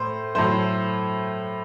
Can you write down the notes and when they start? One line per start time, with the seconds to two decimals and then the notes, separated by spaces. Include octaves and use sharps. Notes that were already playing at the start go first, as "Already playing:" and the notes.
Already playing: A2 A3 C5
0.35 A2 F#3 A3 C5